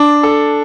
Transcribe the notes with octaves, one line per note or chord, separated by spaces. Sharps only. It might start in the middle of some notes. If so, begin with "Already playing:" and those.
Already playing: D4
A4